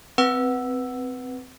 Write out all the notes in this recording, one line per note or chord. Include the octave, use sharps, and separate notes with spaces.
C4 B4 F#5 E6